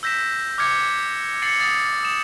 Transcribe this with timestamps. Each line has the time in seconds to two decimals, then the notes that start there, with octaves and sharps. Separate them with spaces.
0.03 E6 G6 A#6 B6 E7
0.58 D6 F6 G6 G#6 C#7
1.42 A6 C7 C#7 F#7
1.60 D#6 A6 C#7
2.03 D#6 E7